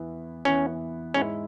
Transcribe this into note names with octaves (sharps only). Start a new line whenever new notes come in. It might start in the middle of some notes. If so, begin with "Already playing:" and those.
Already playing: E2 E3 B3 E4
E2 E3 B3 C#4 E4
G#2 G#3 C#4 E4